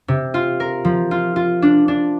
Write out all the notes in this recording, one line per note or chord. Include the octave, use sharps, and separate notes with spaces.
C3
F4
A#4
F3
F4
F4
D4
D4